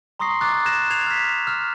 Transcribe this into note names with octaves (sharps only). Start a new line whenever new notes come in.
A#5 C6 C#6 D#6 A#6 C7
A#5 D6 F#6 A6
F#6 G#6 A#6 E7
G#6 C7 E7 F7
F6 B6
E6 F6